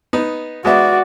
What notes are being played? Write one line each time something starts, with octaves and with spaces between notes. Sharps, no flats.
B3 D#4
G#3 B3 F#4 D5 E5